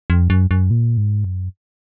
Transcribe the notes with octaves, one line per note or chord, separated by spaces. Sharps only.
F2
F#2
F#2
A#2
G#2
F#2